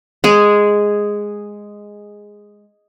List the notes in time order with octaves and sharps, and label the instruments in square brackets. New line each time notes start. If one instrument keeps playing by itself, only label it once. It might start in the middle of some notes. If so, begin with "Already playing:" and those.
[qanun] G#3 G#4